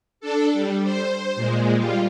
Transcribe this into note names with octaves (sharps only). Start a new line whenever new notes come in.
D4 A4
G3
C5
A#2 G#3
G3 F4